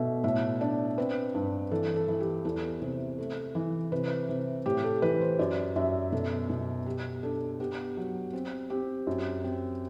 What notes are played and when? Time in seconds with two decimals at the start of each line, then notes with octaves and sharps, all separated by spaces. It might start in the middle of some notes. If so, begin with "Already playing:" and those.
Already playing: B2 A3 E5
0.24 A2 E5
0.61 D4 D5
0.98 C4 B4
1.35 G2
1.71 E3 A4
1.96 A4
2.08 E3
2.20 G4
2.45 E2 A4
2.82 C3
3.18 A3
3.55 E3
3.92 C3 B4
4.29 C3
4.66 A2 G4
4.84 A4
5.02 E3 B4
5.21 C5
5.39 F#2 D5
5.76 F#2 E5
6.12 B2 A4
6.50 B2
6.86 B3 G4
7.23 D4 A4
7.60 B3 G4
7.97 F#3
8.33 C4
8.70 C4 G4
9.07 F#2
9.44 C4